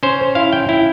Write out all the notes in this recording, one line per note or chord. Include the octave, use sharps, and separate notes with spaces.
C#4 C5
E4 F5
G5
E4